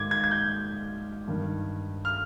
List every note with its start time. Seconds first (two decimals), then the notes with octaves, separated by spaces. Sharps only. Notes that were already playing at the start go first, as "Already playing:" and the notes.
Already playing: G#2 D#3 D6 G#6
0.11 G#6
0.24 G#6
0.31 G6
1.27 G2 D#3
2.05 F6